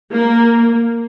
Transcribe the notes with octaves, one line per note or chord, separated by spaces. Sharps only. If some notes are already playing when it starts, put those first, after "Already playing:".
A#3